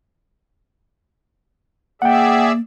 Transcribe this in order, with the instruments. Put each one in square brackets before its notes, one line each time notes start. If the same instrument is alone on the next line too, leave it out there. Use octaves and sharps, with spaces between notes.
[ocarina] A#3 [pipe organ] G#4 D5 E5 [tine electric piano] F#5 G5